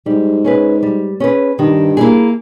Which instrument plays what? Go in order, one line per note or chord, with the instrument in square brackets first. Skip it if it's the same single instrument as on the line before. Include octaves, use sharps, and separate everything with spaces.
[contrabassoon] G#2 [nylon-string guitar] G3
[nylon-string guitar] C#4 G#4 B4
G3
C#4 G#4 B4
[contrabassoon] G2 [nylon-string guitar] D#3
[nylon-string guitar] A#3 E4 G#4